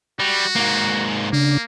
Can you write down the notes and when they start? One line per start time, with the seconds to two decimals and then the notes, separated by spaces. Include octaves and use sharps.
0.20 G3 F#4
0.56 G#2 A#3
1.33 C#3 A#3 D4